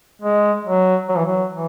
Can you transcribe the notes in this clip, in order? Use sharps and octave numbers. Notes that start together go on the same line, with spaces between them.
G#3
F#3
F#3
E3
F#3
E3